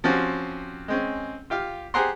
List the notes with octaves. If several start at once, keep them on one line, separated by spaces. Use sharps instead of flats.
F3 C4 C#4 F#4 G4
G#3 C4 C#4
F4 G4 F5
G4 G#4 C5 F#5 A#5 C6